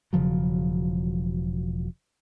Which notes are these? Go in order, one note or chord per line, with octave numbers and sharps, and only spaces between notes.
E1 C#3 F3 F#3